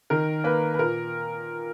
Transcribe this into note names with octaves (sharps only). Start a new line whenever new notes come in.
D#3 A#4
A#3 B4
B4
A#2 A#4